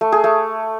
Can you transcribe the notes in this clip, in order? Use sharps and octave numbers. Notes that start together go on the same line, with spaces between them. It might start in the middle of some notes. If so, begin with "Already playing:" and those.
A3
G#4
A3